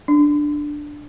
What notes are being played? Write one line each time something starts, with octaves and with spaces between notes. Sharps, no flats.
D4